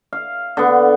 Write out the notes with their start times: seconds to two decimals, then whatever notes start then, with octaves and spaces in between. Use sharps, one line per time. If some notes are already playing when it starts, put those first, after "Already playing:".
0.13 F5
0.57 D3 B3